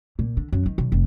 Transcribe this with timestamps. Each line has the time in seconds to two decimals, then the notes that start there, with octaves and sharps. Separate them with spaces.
0.19 A#2
0.37 D3
0.52 F#2
0.66 D#3
0.78 B1
0.92 F1